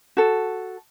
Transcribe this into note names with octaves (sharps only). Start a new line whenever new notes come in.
F#4 A4